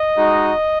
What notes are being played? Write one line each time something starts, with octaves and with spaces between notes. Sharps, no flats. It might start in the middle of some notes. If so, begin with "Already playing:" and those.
Already playing: D#5
G#3 D#4 F#4